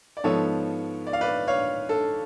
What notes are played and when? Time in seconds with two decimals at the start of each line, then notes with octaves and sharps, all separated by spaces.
0.17 D5
0.24 G#2 F3 B3 A4 C#5
1.07 D5
1.13 F5
1.21 B4 D5
1.48 C#5 F5
1.89 A4